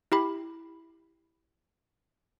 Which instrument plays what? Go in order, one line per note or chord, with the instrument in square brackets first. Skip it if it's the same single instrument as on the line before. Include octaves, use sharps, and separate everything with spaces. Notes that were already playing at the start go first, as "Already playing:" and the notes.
[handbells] E4 G4 B5